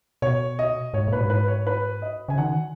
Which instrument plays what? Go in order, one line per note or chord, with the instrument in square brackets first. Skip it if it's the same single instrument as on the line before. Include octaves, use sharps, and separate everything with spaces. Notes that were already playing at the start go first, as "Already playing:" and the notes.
[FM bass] B2 [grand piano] C#5
[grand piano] D#5
[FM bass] G#2 [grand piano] C#5
[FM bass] A#2 [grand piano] B4
[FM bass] G#2
[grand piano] B4
C#5
B4
D#5
[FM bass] C#3 [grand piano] G#5
[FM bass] D#3 [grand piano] F#5